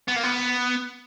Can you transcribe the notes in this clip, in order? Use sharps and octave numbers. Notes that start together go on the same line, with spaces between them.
B3
A#3
B3